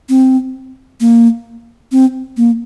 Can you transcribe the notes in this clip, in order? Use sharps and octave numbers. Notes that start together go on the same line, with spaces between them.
C4
A#3
C4
A#3